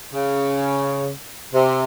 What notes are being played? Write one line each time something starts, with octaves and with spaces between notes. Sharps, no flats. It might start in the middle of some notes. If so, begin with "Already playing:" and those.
C#3
C3